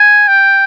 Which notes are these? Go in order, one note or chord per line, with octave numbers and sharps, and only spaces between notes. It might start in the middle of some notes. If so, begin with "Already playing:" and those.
Already playing: G#5
G5